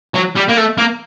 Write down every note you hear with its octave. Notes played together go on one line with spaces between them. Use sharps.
F#3
G3
A#3
A3
A#3